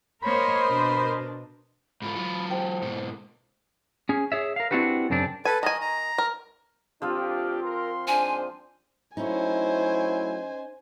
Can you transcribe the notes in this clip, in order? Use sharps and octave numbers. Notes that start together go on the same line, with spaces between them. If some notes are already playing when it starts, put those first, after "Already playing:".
A#3 A#4 C5 C#5 D#5 B5
B2 D4
G#2 F4 B5
F#3 F4
G4 C5 G5
G#2 B2
B4
C#4 G#4
G#4 C#5 E5
A#4 F5
C4 D4 E4 F#4 G4 B4
F#2 C#3 C4 D4
A4 B4 G#5
D#3 D#5 G#5
A#5
A#4
D2 F3 C4 D4 F4 G4
A#4 C6
G#2 D4 C5 G#5
F#3 A3 C#4 D#4 E4 C5 G#5